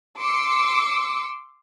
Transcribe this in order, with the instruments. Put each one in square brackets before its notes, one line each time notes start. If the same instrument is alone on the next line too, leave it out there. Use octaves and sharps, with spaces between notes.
[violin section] C6 D6 E6 C#7